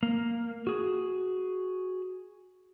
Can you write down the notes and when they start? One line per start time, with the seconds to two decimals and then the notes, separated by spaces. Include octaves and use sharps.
0.03 A#3
0.67 F#4 G#4